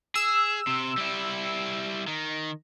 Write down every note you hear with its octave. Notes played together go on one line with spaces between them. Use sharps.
G#4 E6 E7
C3
G3 E4
D#3